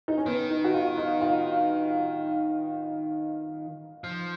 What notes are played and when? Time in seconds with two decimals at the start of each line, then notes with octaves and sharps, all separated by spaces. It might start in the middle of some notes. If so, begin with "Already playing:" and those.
0.08 D#4
0.17 C#4
0.26 D#3 B3
0.50 D#4
0.64 F#4
0.74 F4
0.97 D#4
1.21 F4
4.04 F3